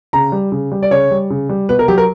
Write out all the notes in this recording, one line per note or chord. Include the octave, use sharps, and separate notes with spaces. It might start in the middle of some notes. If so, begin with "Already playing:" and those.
C#3 A#5
G3
C#3
G3
D5
C#3 C#5
G3
C#3
G3
B2 B4
A#4
F#3 G4
A#4